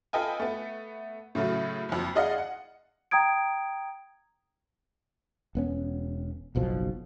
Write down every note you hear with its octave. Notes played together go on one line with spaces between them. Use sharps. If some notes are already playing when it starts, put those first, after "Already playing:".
F4 A4 B4 D#5 G5 G#5
A3 B3
A2 C#3 F#3 A3
F#1 F2
G#4 D5 D#5 F5 F#5
F#5
G5 A#5 D#6 G#6 D7
E1 B3 C#4
F#1 B1 B2 F3